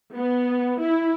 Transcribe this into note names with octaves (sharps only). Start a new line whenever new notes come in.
B3
E4